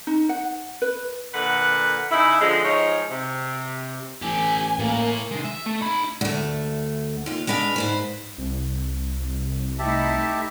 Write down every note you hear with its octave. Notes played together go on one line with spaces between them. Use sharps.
D#4
F#5
B4
A#2 D3 B4 F#5
C#3 D#4 E4
D3 F3 G#3
F3 G#3 D#4 C#5
C3
A1 G4 A4 G#5
A2 A#3
D#2 G#3
E5
A3
D#4 B5
D2 A3
D#2 F4
G#3 D4 B4 E5 F5
G#2 B4 C5
C2
A3 D#4 E4 G4 E5 A5